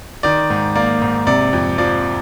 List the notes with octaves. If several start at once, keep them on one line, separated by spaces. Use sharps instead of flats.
D#3 D5
G#2
A#3 D5
G#2
C3 D5
F2
F3 D5